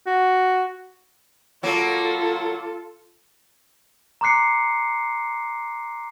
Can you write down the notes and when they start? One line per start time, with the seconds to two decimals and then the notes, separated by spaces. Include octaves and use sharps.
0.07 F#4
1.63 F#3 A#3 F4 A4
4.21 A#5 C6 D6 F#6 C7 C#7